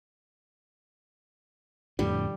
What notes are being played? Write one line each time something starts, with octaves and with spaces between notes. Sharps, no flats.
F2 A2 D3 G3